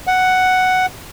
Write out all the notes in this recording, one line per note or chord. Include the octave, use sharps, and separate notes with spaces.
F#5